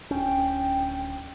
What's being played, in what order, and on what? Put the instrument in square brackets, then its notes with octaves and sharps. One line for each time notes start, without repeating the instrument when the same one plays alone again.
[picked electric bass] D1 C#4 [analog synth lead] G5